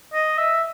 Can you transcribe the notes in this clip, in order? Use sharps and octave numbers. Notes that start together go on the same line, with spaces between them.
D#5
E5